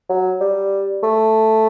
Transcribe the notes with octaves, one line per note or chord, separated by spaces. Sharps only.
F#3
G3
A3